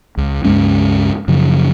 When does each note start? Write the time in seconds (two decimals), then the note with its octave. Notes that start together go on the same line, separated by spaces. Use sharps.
0.17 C#2
0.44 C#2 G2 G#3 C#4
1.28 F#2 C#3 F3